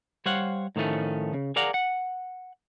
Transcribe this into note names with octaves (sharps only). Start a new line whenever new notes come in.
G3 C5 C#5 F5 F#5
A2 D#3 F3 A3 C#4
C#3
G#4 A#4 D5 F5 F#5 A#5
F#5